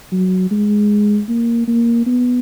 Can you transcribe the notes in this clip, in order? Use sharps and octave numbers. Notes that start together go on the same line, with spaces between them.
F#3
G#3
A#3
A#3
B3